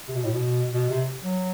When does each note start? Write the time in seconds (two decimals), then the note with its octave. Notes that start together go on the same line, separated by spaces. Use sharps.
0.09 C3
0.16 B2
0.24 A2
0.33 B2
0.74 B2
0.90 C3
1.23 F#3